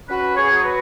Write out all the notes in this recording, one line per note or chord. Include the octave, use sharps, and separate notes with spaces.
C#4 F#4 B4
G#4 C#5
F#3
G#4
F#4 B4